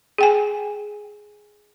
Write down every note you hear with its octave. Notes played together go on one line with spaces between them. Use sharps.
G#4 G5 G#5